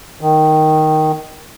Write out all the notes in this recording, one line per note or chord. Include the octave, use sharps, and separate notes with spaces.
D#3